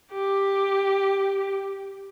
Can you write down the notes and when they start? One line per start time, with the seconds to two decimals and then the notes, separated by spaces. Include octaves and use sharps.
0.13 G4